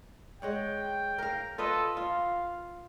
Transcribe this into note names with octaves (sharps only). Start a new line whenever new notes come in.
G#3 C#5 F#5 G5
A#4 F5
F4 A4 B4 D#5
F4 F5